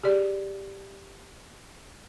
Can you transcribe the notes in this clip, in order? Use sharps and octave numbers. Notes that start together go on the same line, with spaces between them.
G4 G#4 D5